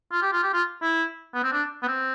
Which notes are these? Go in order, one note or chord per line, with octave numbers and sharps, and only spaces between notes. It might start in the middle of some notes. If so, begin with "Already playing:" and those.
F4
G4
F4
G4
F4
E4
B3
C4
D4
B3
C4